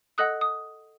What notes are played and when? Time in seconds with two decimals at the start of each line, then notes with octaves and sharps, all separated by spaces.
0.18 A4 D#5 F#5 D#6 F#6
0.41 D#6